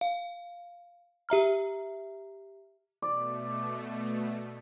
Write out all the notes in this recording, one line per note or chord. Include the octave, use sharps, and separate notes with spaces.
F5
G4 E5 A#5 F6
B2 A3 D5